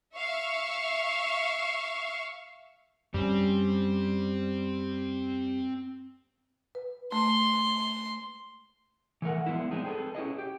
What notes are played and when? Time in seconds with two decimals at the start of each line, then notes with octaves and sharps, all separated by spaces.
0.16 E5 F5 C#6
3.14 F#2 G3 C4 C#4
6.75 B4
7.12 A3 C6
9.22 E3 A3 A#4 F#5
9.46 F3 G#3 B3 D4 E4
9.71 G#3 C4 D4 D#4 G#4
9.85 C4 G#4 A4 B4
10.15 C#4 E4 G#4 D#5
10.38 G4